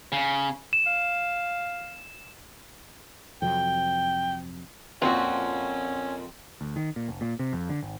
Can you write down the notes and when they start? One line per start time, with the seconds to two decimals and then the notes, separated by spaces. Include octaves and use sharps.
0.12 C#3
0.73 E7
0.86 F5
3.42 F2 C3 F#3 G5
5.02 F2 A#2 C4 C#4 F4 F#4
6.61 D2
6.76 D#3
6.96 A#2
7.08 F1
7.21 A#2
7.39 C3
7.53 F2
7.69 D3
7.83 G#1